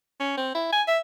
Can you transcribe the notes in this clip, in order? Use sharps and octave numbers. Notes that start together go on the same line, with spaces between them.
C#4
C4
E4
G#5
E5